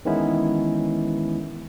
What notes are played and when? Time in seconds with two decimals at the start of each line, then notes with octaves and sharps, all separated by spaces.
0.05 D#3 E3 G#3 B3 C#4 E4